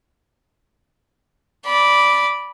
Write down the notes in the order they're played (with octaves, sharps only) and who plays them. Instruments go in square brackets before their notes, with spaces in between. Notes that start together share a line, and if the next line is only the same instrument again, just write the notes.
[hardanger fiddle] D5 B5